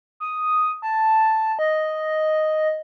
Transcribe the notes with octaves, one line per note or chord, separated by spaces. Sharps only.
D#6
A5
D#5